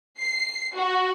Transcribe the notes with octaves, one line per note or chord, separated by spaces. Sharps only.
C7
F#4